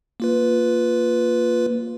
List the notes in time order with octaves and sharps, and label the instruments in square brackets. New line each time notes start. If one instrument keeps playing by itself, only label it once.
[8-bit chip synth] A#3 F4 B4